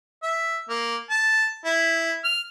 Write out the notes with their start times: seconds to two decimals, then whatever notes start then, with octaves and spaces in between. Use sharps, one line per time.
0.23 E5
0.69 A#3
1.10 A5
1.65 E4
2.25 F6